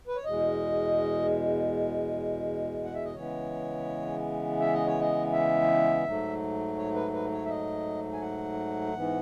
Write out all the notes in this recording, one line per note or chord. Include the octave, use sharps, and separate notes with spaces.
B4
C#5
E2 B2 G#3 D#5
F#5
E5
D#5
C#3 E3 G#3 B3 C#5
E5
D#5
C#5
D#5
E5
G#2 F#3 A3
C#5
B4
B4
C#5
E5
D#5
G#5
F#5
G#2 E3 B3